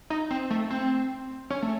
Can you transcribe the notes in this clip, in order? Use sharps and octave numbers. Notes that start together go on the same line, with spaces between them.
D#4
C4
A3
C4
C#4
A3